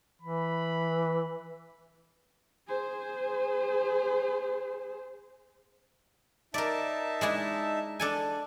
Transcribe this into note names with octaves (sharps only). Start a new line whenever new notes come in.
E3 B5
G#4 C5
D#4 A#4 D5 E5 A5
G#3 D4 E4
D4 A4 G#5